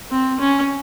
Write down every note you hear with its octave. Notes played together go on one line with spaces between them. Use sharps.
C4
C#4